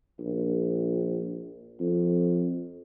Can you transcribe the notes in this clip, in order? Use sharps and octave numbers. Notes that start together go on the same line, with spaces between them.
A#1
F2